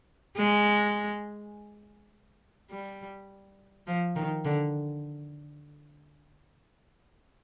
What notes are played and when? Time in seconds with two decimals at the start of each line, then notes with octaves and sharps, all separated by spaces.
0.37 G#3
2.70 G3
3.87 F3
4.16 D#3
4.45 D3